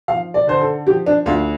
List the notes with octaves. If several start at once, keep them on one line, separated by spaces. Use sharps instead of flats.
F3 F5
D5
D3 C5
A4
F3 G4
D4
D2 F4